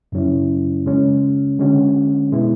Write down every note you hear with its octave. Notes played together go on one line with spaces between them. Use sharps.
F#2 C#3 F#3 C#4 E4
C#3 G#3 C#4
D3 G#3 C#4 F#4
B2 G#3 B3 E4